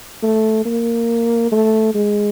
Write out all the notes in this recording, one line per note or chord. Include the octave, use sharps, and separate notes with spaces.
A3
A#3
A3
G#3